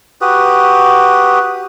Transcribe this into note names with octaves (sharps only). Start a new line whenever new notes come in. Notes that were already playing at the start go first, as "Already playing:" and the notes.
F#4 G4 B4 D#6